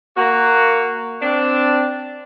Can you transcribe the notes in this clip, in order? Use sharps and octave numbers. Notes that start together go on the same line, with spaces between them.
A#3 F#4
C4 D4